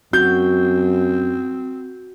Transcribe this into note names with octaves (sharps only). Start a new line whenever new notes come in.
F#2 C4 F#4 G6